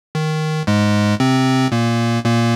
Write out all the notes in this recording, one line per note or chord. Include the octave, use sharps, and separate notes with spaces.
D#3
G#2 G#3
C3 C4
A#2 A#3
A#2 A#3